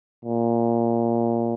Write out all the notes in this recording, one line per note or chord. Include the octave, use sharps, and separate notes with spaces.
A#2